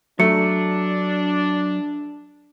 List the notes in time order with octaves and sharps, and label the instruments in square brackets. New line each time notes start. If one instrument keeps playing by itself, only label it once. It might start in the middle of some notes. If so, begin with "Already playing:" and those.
[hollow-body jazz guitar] F#3 [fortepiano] A3 [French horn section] D4 [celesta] C#7